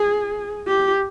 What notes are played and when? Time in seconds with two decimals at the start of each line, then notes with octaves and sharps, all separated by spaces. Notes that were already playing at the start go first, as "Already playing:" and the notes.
Already playing: G#4
0.68 G4